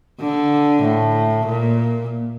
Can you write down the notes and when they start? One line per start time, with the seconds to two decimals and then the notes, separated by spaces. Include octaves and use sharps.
0.20 D3
0.83 A2
1.46 A#2